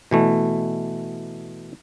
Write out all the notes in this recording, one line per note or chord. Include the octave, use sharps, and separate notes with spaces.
B2 E3 A3